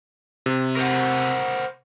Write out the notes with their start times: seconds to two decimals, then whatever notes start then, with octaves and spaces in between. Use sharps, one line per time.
0.46 C3
0.76 A#4 C5 F#5